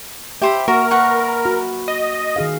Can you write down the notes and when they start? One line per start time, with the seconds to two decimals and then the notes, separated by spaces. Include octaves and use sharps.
0.42 G4 C5 E5 B5
0.68 A#3 F#4 A#4
0.91 B4 F#5 C#6
1.45 F#4
1.88 D#5
2.36 D#3 G#4 F5